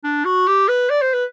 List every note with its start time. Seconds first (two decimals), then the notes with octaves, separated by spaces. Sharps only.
0.04 D4
0.25 F#4
0.47 G4
0.68 B4
0.90 D5
1.02 C5
1.14 B4